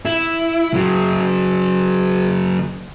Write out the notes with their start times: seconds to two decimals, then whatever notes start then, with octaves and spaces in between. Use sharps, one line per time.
0.05 E4
0.74 C#3 F#3